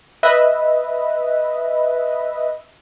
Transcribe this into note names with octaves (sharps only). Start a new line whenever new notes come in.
B4 D#5 E5